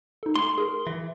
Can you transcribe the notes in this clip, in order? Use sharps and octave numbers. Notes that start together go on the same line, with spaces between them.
D#4 A4
A3 C6
G#4 A#4
E3